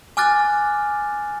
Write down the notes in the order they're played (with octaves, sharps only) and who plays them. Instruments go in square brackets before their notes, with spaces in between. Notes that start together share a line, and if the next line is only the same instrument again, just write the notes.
[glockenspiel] G#5 D6 F6 F#6 A6